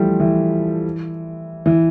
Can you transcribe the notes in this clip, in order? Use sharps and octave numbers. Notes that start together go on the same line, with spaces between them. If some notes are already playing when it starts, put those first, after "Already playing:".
Already playing: E3 F3 G3 A3
E3
E3